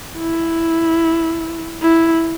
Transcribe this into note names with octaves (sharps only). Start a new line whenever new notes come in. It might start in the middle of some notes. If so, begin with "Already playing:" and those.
E4
E4